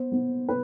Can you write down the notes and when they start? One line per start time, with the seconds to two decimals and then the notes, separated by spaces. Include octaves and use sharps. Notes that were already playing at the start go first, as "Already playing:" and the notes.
Already playing: B3 C5
0.12 B3
0.49 B4